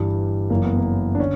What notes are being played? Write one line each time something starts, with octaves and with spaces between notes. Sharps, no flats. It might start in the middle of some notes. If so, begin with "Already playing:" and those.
Already playing: G1 G2 E3 G3
F#1 F#2 E3 A#3
B3
A#3
D4
D3 C#4